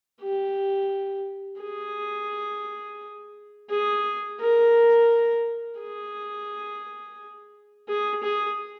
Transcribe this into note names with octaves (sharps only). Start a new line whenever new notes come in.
G4
G#4
G#4
A#4
G#4
G#4
G#4